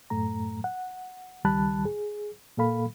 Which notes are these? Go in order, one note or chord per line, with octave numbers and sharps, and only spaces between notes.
F#2 A2 A3 A#5
F#5
C#2 D#3 G3 A5 B5 F#6
G#4
A#2 A#3 A4 F5 B5